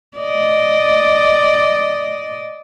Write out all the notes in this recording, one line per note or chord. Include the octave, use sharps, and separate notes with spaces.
D5 D#5